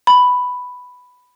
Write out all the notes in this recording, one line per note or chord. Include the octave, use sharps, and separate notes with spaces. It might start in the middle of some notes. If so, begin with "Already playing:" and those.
B5